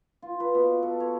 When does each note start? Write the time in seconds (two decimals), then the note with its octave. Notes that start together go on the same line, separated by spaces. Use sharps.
0.22 F4
0.40 B4
0.55 B2
0.83 A4
1.00 C#5